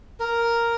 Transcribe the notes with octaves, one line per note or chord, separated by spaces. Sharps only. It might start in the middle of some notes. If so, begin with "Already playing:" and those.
A#4